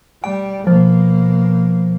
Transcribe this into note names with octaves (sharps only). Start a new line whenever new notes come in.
G3 G5
B2 F3 A#3